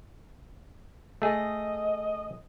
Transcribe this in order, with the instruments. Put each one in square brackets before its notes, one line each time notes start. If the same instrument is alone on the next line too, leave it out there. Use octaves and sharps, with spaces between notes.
[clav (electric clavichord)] A3 G#4 [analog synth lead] D#5